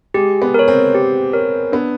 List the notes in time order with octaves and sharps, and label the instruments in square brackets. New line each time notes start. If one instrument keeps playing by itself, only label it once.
[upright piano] G#3 [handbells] G4
[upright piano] B3
[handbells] A#4 C#5
[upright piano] C4
[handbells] G4
A#4 C#5
[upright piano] B3 [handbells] D4